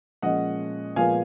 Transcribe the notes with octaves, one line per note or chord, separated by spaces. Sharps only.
A#2 F3 G#3 C#4 D#5 F#5
A#2 F3 G#3 B3 F5 G#5